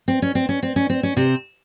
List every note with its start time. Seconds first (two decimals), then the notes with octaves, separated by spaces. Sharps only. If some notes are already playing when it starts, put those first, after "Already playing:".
0.08 C4
0.22 C#4
0.35 C4
0.49 C#4
0.63 C4
0.76 C#4
0.89 C4
1.03 C#4
1.17 C3 C4